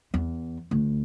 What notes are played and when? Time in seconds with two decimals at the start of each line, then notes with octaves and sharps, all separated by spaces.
0.14 E2
0.71 D2